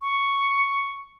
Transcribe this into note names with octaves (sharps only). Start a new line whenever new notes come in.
C#6